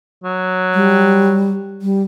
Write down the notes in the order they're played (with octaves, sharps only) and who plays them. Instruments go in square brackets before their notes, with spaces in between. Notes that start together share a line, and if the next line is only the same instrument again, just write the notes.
[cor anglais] F#3
[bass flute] G3
G3